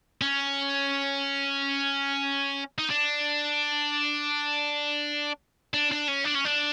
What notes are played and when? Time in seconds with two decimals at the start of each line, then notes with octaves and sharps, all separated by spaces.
0.22 C#4
2.79 D#4
2.90 D4
5.74 D4
5.92 D4
6.08 C#4
6.25 D4
6.35 C#4
6.45 D4